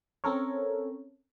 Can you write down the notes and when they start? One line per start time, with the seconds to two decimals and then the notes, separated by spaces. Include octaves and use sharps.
0.24 C4 C#4 A4 A#4 C#5